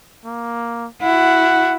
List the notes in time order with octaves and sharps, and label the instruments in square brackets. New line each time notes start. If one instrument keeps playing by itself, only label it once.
[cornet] A#3
[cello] E4 F#4 [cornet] F#5